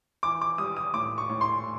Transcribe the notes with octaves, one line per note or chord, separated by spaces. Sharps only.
E3 D6
D6
G3 D#6
D#6
A2 D6
C#6
A2
C6